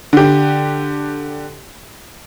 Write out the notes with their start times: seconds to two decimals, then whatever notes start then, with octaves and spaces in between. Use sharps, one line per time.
0.13 D3 G4